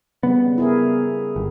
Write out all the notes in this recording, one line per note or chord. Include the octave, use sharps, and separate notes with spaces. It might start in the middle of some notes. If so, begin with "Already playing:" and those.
C#3 G3 B3
E4 G#4 A#4
G1